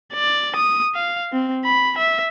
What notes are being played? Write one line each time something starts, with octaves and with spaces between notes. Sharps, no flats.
D5
D#6
F5
C4
B5
E5